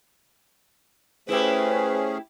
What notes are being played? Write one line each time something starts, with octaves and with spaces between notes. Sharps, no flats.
A3 C#4 E4 G4 G#4 B4 C5